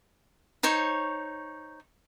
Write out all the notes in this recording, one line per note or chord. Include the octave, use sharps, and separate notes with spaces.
D#4 C5 C#5 C#6